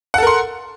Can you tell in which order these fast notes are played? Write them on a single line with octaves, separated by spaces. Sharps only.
F#5 A4 A#4 C6